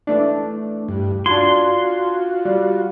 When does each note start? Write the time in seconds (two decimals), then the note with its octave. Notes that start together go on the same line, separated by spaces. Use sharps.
0.07 E3 A3 D4
0.88 G2
1.26 D4 F4 F#4 C6 G#6
2.45 G3